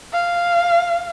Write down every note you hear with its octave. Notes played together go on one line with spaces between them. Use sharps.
F5